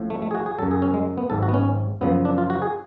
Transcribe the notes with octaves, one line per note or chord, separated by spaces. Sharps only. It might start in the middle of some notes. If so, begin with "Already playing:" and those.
Already playing: A1 A2 F3
A3
A3
G#4
F#4
G#4
F#2 C#3 F#3 A4
G#4
C#4
G#3
B3
G#1 G#2 F#3 A4
F#4
B3
C#4
F#2 C#3 F3 B3
D4
F4
F#4
G#4